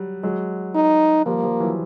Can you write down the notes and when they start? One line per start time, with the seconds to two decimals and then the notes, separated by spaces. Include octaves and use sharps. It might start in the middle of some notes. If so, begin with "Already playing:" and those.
Already playing: F#3 G3
0.23 F#3 G#3
0.75 D#4
1.26 F3 G3 A#3
1.43 F3 G3
1.60 E3 F#3